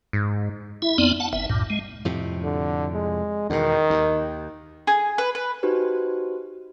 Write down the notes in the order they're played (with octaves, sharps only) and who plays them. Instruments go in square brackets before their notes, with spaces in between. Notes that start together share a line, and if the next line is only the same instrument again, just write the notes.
[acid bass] G#2
[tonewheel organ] E4 E5
F2 B3 C4 D#4 D5
F#5 A5
G1 E5
D2 G2 A#2
G#3
[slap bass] F2 A2 C3
[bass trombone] D3
G#3
[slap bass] E2 B2 [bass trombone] D#3
[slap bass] D#2
[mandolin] G#4
B4
B4
[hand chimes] D#4 F#4 G4 B4 C5